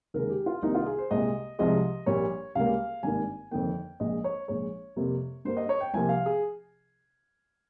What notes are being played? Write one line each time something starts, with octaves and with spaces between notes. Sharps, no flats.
D#2 C#3 G#3 A#4
G4
F4
C2 C3 D#3 A#3 D#4
F4
G#4
C5
C2 A#2 G#3 D#5
C2 C3 F3 G#3 D#5
A#1 A#2 G3 A#3 C#5
C#2 C#3 G3 A#3 F5
G#1 G2 D#3 A#3 G#5
G1 F2 D#3 A#3 G5
A#1 A#2 G#3 D#5
C#5
A#1 A#2 G#3 C#5
F2 C3 G3 A#3
G2 G3 A#3 C5
D#5
C#5
G5
C2 C3 F3 A#3 G#5
F5
G#4